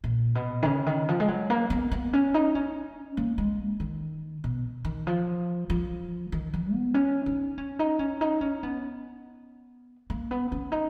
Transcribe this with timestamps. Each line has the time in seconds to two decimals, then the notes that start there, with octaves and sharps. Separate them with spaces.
0.04 A#2
0.35 B2
0.62 D#3
0.65 C#3
0.86 D#3
1.08 F3
1.20 G#3
1.28 F#3
1.50 A#3
1.70 B3
1.91 B3
2.13 C#4
2.34 D#4
2.55 C#4
3.17 A#3
3.38 G#3
3.80 D#3
4.44 B2
4.85 D#3
5.07 F3
5.70 F3
6.32 D#3
6.53 F3
6.73 B3
6.94 C#4
7.26 D#4
7.58 C#4
7.79 D#4
7.99 C#4
8.21 D#4
8.41 C#4
8.63 B3
10.10 A#3
10.31 B3
10.52 C#4
10.72 D#4